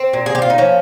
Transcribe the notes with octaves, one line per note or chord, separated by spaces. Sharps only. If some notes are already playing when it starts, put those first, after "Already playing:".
Already playing: C4
A#2
G#4
G4
F4
D#4
F3 C#4